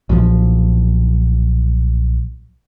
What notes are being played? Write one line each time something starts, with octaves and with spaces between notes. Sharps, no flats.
B1 A#2 D3 F3